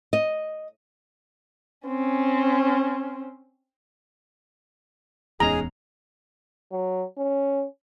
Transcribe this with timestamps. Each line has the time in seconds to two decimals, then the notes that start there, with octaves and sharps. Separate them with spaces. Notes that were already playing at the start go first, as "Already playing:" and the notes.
0.13 D#5
1.88 C4 C#4
5.40 D1 E2 G#3 B3 C#4 D#4 G#4 A#5
6.72 F#3
7.18 C#4